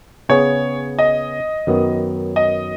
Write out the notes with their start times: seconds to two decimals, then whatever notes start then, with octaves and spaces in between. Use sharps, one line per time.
0.29 C#3 B3 G#4 C#5
0.99 D#5
1.67 F#2 D#3 F#3 B3
2.36 D#5